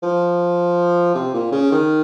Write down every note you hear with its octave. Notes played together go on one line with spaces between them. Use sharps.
F3
C3
A#2
C#3
D#3